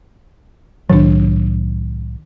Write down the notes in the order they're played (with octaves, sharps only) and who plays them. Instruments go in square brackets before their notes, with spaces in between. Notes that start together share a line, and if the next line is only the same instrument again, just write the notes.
[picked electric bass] C2 A2 F#3 [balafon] D#3 D4